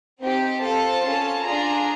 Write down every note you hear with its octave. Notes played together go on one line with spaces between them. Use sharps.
C4 D#4 G4
C4 F4 A4 A5
C#4 F4 A4
D4 F4 G#4 A#5